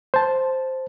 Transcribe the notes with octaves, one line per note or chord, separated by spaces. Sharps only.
C5 A5